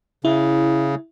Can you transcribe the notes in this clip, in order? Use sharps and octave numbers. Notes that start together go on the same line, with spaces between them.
C#3 E4